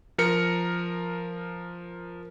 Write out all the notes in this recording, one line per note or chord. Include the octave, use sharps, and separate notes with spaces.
F3 A#4 C#7